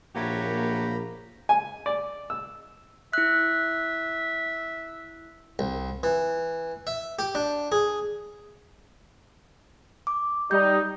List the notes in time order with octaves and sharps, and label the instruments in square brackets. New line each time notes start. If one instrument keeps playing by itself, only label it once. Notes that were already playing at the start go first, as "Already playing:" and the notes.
[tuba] A#1 [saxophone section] F#3 A3 G4 [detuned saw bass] A#3 [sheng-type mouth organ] A#5 B5
[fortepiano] G#5
D5
E6
[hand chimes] E4 F#6 [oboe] E5
[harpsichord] C2
E3
E5
G4
D4
G#4
[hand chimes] D6
[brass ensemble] G3 D#4 [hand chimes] G6